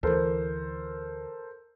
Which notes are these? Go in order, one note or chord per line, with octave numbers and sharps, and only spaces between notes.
D2 E3 A4 A#4 C5